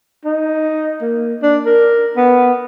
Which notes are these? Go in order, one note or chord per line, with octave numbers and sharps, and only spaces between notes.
D#4
A#3
D4
A#4
B3